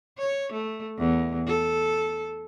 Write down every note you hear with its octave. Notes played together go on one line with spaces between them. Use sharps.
C#5
A3
E2
A4